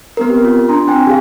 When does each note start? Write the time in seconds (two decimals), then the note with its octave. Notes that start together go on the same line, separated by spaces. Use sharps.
0.17 B3 C4 A#4
0.30 G4
0.44 F4
0.68 D4 A#5 C6
0.88 C4 G5 G#5
1.07 G4 G#4 F5